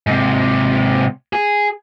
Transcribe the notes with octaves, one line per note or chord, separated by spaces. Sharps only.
G#2 C3
G#4